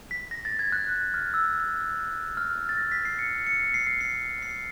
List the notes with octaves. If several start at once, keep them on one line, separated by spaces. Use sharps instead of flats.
B6
A#6
A6
G#6
F#6
F6
E6
F6
A6
A#6
B6
C7
C#7
C7
C#7
C7
C7
C7
C7
C7